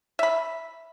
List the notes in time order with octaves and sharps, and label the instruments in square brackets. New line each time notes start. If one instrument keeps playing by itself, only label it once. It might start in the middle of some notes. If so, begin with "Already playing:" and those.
[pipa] E5 B5